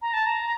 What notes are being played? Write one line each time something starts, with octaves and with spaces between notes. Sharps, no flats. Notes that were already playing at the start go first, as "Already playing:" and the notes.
A#5
A5
A#5